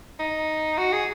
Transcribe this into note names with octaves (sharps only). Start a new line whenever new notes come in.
D#4
F#4
G#4